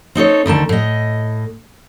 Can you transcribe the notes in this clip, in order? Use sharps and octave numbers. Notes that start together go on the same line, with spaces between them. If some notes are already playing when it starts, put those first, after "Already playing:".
C4 D#4 A4 C#5
D2 D3 D#3 A5
A2 D#5